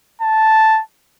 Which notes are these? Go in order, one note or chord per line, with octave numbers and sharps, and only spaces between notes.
A5